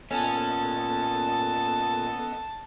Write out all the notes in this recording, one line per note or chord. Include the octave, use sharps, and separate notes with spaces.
A#2 B3 C#4 A4 D#5 A5